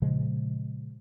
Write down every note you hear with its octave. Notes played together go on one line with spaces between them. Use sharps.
A#2 C#3 F3 G#3